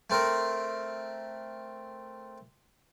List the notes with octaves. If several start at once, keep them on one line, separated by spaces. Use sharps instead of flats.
A3 C4 A#4